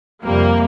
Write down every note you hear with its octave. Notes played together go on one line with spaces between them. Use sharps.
F2 C3 G3 A#3